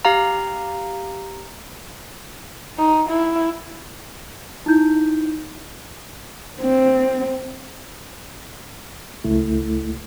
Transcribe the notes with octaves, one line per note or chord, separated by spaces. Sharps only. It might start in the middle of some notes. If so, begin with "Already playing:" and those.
G4 F5 A#5
D#4
E4
D#4 E4 G6
C4
C#2 A3 E4